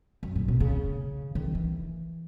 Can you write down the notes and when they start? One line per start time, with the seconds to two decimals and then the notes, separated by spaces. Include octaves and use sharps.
0.23 F#2
0.36 A#2
0.48 B2
0.60 C#3
1.35 D#3
1.55 E3